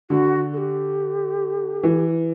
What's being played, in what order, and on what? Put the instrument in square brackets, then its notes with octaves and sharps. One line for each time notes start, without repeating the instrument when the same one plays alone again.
[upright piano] D3 [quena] F#4
[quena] A4
G4
[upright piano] E3